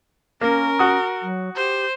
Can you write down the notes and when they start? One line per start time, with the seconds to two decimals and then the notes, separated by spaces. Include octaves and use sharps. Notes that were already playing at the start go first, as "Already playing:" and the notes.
0.41 A#3 C#4 A#4
0.79 F#4 D#6
1.22 F#3
1.56 G4 C5